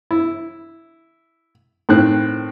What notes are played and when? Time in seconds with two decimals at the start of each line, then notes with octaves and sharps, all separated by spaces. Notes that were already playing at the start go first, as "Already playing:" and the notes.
0.11 E4
1.89 A2 D#3 C4 F#6